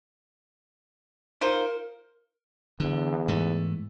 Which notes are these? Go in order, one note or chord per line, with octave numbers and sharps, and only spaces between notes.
D#4 F4 A#4 C5
E2 D3
G#2 E3 A3